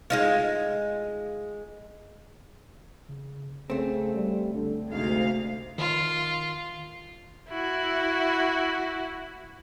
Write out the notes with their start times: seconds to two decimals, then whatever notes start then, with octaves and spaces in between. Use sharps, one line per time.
0.10 G#3 D#4 F4
3.09 C#3
3.70 B1 C#3 A3 C4
4.14 F1 G3
4.53 B1 D3
4.91 G#1 D2 G#2 C3 F5
5.78 D#3 F4
7.49 E4 F#4